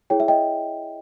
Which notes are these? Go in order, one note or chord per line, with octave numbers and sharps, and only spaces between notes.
E4 G#4 C#5 G5
E5
D#5 G5